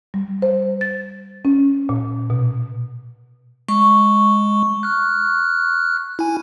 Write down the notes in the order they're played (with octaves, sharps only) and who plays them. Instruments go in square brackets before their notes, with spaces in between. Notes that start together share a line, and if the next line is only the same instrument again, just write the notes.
[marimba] G3
C5
A6
C#4
A#2
B2
[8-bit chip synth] G#3 [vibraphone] C#6
[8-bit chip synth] F6 F#6
E4 G#5